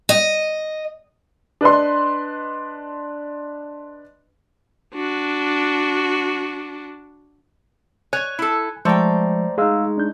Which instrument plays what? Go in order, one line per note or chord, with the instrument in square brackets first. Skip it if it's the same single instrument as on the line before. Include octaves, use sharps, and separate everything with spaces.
[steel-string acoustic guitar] D#5
[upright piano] D4 B4 D#5 C6
[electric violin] D4 F#4
[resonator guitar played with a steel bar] C#5 [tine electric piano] G#5 G#6 [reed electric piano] F#6
[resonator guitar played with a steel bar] E4 A4
[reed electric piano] F3 G#3 [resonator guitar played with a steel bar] A3 G5 [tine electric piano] C5 D5 A#5
[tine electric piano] G#3 D#4 [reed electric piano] G#4 F5 E6
[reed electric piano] D4 G6